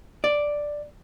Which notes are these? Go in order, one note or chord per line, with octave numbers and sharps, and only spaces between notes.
D5